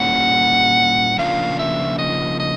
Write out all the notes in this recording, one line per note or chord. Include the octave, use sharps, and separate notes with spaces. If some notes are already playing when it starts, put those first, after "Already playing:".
Already playing: A#2 G3 A#3 C#4 E4 F#5
C#3 F3 A#3 D4 F4 F5
E5
D#5
D#5